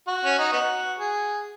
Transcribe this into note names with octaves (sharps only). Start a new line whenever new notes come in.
F#4
C#4
D#4
B3 D#4 F#4
G#4